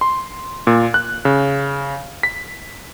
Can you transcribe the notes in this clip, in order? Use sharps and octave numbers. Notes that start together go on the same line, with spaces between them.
C6
A#2
F#6
C#3
B6